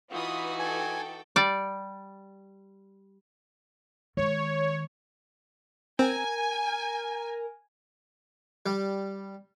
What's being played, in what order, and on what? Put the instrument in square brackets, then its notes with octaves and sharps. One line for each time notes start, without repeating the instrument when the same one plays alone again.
[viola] E3 D#4 [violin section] F4 B4 D#6 [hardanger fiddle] F#4
[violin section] A4 G5 [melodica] G#5
[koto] G3 D5
[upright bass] D#3 G#3 [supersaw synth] C#5
[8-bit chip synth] C4 [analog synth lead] A#4 [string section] G#5
[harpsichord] G3